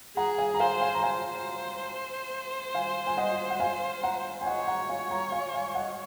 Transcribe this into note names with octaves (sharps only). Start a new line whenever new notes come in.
G#4 F#5 A#5
F5 G#5
A#5
C5 F5 G#5
F5 G#5
A#5
C5 F5 G#5
F5 G#5
G#5
D#5 F#5
F#5
F5 G#5
F#5 A#5
G#5
C#5 D#5 F#5
F#5 A#5
F5 G#5
F#5 A#5
F5 G#5
F5 G#5
D#5 F#5